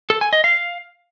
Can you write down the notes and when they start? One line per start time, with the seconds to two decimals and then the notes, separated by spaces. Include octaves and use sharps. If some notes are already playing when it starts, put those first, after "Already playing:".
0.10 A4
0.21 G#5
0.33 D#5
0.44 F5